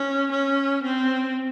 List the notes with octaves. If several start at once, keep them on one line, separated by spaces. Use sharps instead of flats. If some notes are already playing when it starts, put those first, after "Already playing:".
Already playing: C#4
C#4
C4